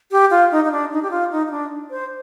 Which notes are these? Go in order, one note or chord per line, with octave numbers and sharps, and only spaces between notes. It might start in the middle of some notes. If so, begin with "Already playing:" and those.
G4
F4
D#4
D#4
D4
D#4
G4
F4
D#4
D#4
D4
C5